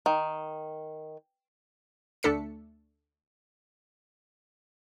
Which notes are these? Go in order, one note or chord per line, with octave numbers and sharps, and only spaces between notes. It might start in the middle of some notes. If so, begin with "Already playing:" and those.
D#3
D2 A3 D4 A4 B6 C#7